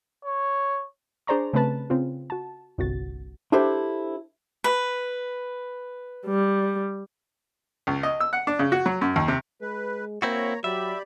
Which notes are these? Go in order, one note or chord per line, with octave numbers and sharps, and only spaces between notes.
C#5
D4 G#4 C5 D5 A#5 C#6
C#3 A3 C4 B4 A5
C#3 C4 F4
F#4 A5
G1 C2 F#4 A6
D4 E4 G4 A4 C5 E5
B4
G3
C#2
D#5
E6
F#5
D4
C#3
F#4
F#3
F#2
D#2
C3
G#3 B4
A#3 C4 E4 F#4 C#5 A#5
F#3 G4 D5 E5 B5